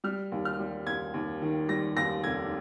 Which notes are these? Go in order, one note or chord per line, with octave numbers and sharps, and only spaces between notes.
G3 F6
D#2
F6
G3
D#2 G#6
D#2
D#3
G3 A#6
D#2 A#6
F1 G#6